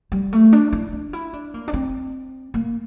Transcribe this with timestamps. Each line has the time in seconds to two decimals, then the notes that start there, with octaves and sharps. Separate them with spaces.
0.12 G3
0.33 A3
0.53 D4
0.73 E4
0.93 D4
1.13 E4
1.33 D4
1.54 A#3
1.68 D4
1.73 C4
2.54 A#3